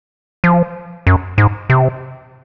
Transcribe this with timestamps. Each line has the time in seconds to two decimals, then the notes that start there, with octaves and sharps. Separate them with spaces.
0.44 F3
1.07 F#2
1.38 G#2
1.70 C3